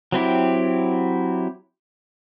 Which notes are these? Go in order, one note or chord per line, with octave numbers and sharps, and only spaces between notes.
F#3 C4 E4 G4